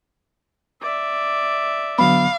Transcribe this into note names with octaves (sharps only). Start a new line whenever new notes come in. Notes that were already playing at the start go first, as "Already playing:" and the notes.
D5 E5
D3 F#3 B3 F5 B5